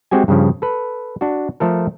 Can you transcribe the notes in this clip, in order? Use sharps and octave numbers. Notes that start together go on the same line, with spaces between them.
G#3 C4 F#4 G4 G#5
G2 C#3 F3
A4 B4
D4 F#4
F3 A3 A4 A#4